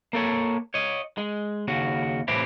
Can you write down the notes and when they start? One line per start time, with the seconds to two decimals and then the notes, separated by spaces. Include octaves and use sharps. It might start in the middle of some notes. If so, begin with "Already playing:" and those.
0.13 A#3 A4 C#5
0.74 C#5 D#5
1.18 G#3
1.68 D#2 C#3 F#4
2.28 A2 C3 E3 C4 E4 G4